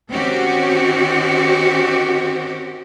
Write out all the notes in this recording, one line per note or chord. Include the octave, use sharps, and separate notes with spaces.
D#3 C4 C#4 F#4 G4